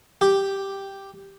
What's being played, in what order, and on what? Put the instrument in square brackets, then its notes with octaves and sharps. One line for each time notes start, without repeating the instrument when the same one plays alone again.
[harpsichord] G4